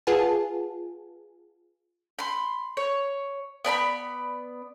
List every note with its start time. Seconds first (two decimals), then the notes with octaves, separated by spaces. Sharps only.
0.07 F4 G#4 B4 F#5 G#5 A5
2.19 B5 C6
2.77 C#5
3.65 B3 D5 A#5 B5